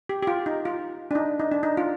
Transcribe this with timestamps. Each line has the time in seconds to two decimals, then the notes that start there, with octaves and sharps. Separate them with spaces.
0.09 G4
0.23 G4
0.27 F4
0.46 D#4
0.65 F4
1.11 D4
1.15 D#4
1.40 D#4
1.52 D4
1.63 D#4
1.77 F4